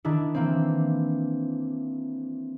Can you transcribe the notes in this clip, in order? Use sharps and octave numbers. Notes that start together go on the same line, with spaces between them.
D#3 D4 E4
E3 A#3 C4